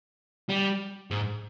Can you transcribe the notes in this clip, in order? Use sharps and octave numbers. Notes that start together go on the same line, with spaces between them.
G3
G#2